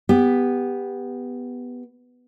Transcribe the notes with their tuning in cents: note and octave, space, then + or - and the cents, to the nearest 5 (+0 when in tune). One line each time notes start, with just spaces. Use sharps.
B3 +0 G4 +20